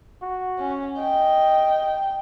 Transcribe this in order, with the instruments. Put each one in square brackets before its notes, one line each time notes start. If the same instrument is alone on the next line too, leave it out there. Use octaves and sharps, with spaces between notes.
[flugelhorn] F#4
[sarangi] C#4
[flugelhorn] D#5 [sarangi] G5